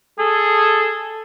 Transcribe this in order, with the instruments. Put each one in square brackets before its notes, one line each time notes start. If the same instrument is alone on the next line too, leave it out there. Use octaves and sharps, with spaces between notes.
[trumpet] G#4 [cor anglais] A4